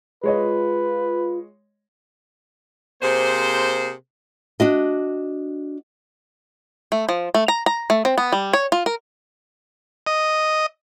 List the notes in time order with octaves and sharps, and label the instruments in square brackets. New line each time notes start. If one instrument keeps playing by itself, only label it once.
[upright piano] G#3 C#5 D#5 [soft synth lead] F4 [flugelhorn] B4
[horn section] C3 A#3 G#4 C5
[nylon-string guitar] D4 F#4 D#5
[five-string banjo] A3
F3
A3
A#5
A#5
A3
C4
B3
G3
C#5
F4
A#4
[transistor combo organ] D#5